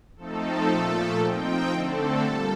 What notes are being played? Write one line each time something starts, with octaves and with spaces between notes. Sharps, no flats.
F3 A3 C4 D#4 A4
A#2 F3 A3
F3 C4 D#4 G5
D3 A3 C4 A4
A#2 G3 A4